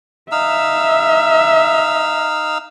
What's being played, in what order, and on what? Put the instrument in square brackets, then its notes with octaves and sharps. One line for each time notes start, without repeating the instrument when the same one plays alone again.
[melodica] D#4 F5 E6 [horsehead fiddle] E5